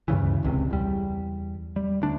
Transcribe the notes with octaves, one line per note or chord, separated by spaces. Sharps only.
D2 G2 C#3 E3
E1 C#2 C3
E2 G3
G3
D2 D4